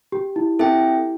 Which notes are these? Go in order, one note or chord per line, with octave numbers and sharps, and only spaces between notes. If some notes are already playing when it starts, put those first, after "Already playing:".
G4
E4
C4 E4 A4 E5 G5